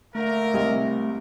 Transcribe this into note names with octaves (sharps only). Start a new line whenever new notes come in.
D3 A3 A#3 A#4 E5
C2 D#5